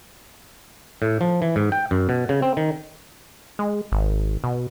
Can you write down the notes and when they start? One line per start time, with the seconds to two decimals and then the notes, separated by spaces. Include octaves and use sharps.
1.02 A2
1.21 F3
1.42 E3
1.56 G#2
1.72 G5
1.91 F#2
2.09 B2
2.29 C#3
2.42 C4
2.57 D#3
3.59 G#3
3.92 G#1
4.44 B2